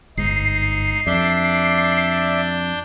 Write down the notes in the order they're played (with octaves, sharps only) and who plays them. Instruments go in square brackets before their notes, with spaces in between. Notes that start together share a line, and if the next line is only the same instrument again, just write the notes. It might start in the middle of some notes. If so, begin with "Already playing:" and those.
[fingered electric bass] G1 G#2 [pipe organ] D#4 [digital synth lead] C7
[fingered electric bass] F2 [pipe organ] D4 G6 [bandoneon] D5 E5